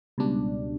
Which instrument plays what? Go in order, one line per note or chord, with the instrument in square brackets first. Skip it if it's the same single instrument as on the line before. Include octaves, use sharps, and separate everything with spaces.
[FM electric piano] C#2 B2 G3 D4